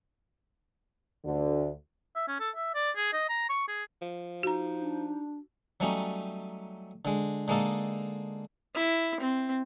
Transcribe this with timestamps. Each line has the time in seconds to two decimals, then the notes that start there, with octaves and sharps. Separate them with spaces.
1.24 D2 D3
2.16 E5
2.28 C#4
2.40 A4
2.56 E5
2.75 D5
2.97 G#4
3.13 D#5
3.29 A#5
3.49 C#6
3.68 G#4
4.02 F3
4.43 D#4 F#4 A#5
4.80 D4
5.80 F#3 G3 A3 C#4 D#4
7.05 D3 G#3
7.48 D3 G#3 A#3 D#4 A4
8.75 E4
9.20 C4